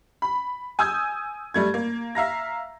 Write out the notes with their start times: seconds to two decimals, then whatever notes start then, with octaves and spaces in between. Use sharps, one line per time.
0.22 B5
0.79 G#5 D#6 E6 G6 G#6
1.54 G3 A3 G#6
1.74 A#3
2.15 E5 F5 A#5 A#6